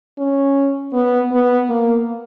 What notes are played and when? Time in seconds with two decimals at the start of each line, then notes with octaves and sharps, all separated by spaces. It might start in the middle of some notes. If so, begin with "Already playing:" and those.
0.18 C#4
0.93 B3
1.32 B3
1.69 A#3